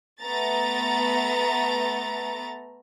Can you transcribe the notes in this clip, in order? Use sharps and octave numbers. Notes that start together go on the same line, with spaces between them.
A3 B3 A#5 A6